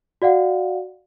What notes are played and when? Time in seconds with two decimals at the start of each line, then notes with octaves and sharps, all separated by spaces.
0.22 F#4 D5 F5 F#5